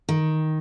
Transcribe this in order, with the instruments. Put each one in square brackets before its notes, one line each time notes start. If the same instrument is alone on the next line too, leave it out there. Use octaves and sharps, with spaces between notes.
[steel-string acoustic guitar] D#3